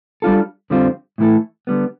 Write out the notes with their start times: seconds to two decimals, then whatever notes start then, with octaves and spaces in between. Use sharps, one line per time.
0.22 G3 D4 F4 A4
0.70 F2 D3 G3 C4 F4
1.18 A2 E3 A3 E4 A4
1.67 D3 G3 B3